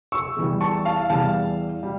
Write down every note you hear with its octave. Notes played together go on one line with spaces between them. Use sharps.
C#6 E6
E2 E3 G3
A5 C#6
F5 A5
E2 E3 G3 F5 A5
G3